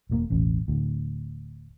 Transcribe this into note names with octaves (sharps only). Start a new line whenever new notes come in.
E1 A2 A#3
E1 A1 C#4
D1 D2